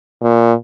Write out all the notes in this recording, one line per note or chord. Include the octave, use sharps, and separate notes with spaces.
A#2